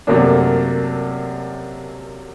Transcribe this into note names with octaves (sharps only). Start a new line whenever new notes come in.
F#2 C3 A3 A#3 C#4 D4